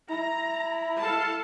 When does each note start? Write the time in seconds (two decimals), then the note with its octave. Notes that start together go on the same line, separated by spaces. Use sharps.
0.10 E4 A#5
0.99 A4 F5 A5